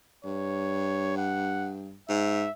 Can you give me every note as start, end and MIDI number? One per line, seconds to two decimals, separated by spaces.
0.25 2.00 43
0.25 1.14 73
1.17 1.73 78
2.09 2.46 44
2.09 2.51 76